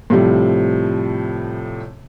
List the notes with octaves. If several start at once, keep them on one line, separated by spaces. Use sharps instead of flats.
A2 C3 F3 G3